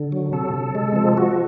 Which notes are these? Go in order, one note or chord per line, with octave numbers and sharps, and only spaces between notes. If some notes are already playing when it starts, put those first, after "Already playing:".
Already playing: D3
F#3
C3 A4
C3
G#3
F3
F3 F#4